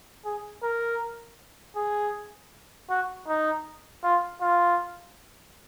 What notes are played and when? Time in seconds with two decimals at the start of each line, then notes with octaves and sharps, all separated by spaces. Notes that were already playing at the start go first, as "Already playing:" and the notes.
0.25 G#4
0.63 A#4
1.76 G#4
2.90 F#4
3.28 D#4
4.04 F4
4.41 F4